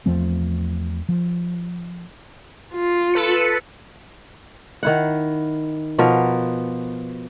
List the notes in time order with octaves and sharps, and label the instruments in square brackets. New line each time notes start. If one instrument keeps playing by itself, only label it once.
[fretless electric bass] E2 F3 A3 C4
F3
[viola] F4
[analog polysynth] A4 B4 C#7
[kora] D#3 E4 F#5
B2 F3 B3 A#4